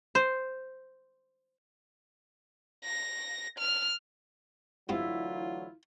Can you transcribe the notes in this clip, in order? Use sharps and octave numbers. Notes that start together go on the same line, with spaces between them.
C5
A#6
F6
D2 G2 E3 F#3 B3 C4 E4 F4